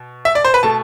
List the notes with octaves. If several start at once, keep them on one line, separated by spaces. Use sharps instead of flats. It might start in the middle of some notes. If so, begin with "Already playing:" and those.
Already playing: B2
E5
D5
C5
B4
B2 A3 A5